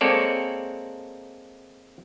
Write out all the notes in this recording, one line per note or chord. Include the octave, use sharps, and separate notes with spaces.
G#3 A#3 C4 A4 C#5 D5